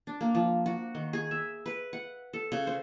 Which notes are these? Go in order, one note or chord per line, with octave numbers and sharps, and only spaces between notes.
D4
A#3
F3
F#4
D#3
G#4
E5
B4
F#5
A4
C#3
C5